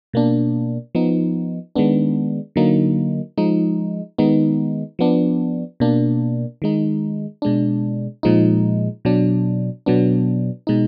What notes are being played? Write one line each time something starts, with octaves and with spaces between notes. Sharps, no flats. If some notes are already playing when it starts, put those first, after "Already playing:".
B2 A#3 D4
F3 B3 D#4
D#3 G#3 B3 D4
D3 F#3 A#3 D#4
F3 G#3 D#4
D#3 G#3 B3 D#4
F3 B3 D4
B2 A#3 D4
D#3 G#3 D#4
B2 G#3 D4
A#2 F3 G#3 D#4
B2 F#3 D4
B2 F#3 B3 D4
B2 G#3 D#4